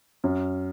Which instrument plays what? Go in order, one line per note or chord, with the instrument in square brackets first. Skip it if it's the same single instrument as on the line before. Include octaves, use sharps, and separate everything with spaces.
[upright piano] F#2